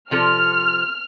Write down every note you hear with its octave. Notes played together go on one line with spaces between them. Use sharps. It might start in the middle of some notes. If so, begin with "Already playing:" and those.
C3 F3 A4 F6